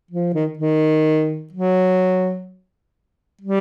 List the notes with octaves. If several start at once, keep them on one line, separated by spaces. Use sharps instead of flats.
F3
D#3
D#3
F#3
G3